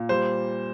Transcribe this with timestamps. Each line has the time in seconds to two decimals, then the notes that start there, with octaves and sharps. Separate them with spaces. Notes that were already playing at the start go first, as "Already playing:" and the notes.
Already playing: A#2
0.09 G3 C5